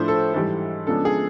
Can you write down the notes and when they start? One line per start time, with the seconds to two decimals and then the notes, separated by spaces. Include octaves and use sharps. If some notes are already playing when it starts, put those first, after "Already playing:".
Already playing: A2 F3 A3 D4 C5
0.08 A4
0.34 G#2 E3 G3 A4
0.87 C#3 F3 G#3 B3 D4 A4
1.05 G#4